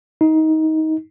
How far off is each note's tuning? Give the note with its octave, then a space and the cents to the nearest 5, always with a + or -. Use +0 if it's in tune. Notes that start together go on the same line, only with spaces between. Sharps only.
D#4 +20